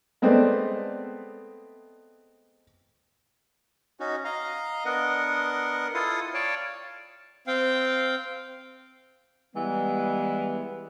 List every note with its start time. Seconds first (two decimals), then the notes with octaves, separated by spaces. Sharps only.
0.22 G#3 A3 B3 C4 D5
4.00 C#4 D#4 F#4
4.25 D#5 F5 A#5
4.85 B3 D4 A#4 D#5 F#5
5.94 E4 F4 A4 F5 D#6
6.34 C#5 D5 F5 G5 A5
7.47 C4 F5 G5
9.55 E3 G3 G#3 B3